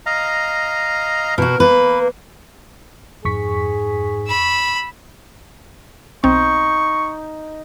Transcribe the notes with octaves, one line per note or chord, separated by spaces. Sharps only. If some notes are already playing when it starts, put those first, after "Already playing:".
D#5 F5 A#5
B2 F#4 A#4
A#3 B4
F2 G#2 G#4 C#6 B6
B5 E6
B1 C4 D#4 C#6